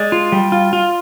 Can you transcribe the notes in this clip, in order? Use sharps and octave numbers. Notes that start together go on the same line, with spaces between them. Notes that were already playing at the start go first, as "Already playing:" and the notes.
Already playing: G#3 D5
F4
G3
F4
F4